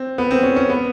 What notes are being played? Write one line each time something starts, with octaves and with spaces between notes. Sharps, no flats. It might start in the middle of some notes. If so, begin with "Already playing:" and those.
Already playing: C4
B3
C4
C#4
C#4
B3